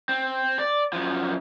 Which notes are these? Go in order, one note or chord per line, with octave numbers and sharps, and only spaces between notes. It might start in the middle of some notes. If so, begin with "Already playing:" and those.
C4
D5
F#2 F3